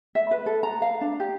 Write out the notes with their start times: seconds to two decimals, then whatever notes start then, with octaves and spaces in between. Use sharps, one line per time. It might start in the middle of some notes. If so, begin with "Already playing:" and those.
0.15 E5
0.31 B4
0.46 A4
0.63 A#5
0.82 F5
1.01 D4
1.20 G4